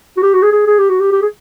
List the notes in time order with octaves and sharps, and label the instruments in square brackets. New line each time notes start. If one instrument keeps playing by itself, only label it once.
[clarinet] F#4
G4
F#4
G#4
G#4
G#4
G4
F#4
G4
G4
G#4